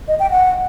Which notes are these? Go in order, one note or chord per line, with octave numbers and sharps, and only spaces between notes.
D#5
G5
F#5